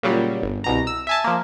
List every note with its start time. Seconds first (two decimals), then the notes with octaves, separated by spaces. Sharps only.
0.03 A#2 C#3 F#3 G3
0.42 G1
0.64 C2 B2 A#5
0.87 E6
1.07 E5 G#5 A5
1.24 F3 A#3